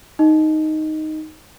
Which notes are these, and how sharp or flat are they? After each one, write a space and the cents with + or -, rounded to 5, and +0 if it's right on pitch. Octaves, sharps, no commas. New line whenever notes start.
D#4 +0 D#5 +0